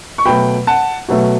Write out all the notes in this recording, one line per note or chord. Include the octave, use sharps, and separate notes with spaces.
C#6
B2 F#3 A3 G5 B5
F#5 A5
B2 F#3 A3